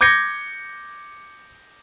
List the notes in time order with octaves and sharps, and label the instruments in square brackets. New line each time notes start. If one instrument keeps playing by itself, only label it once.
[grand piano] D6 G6 G#6 A#6 C#7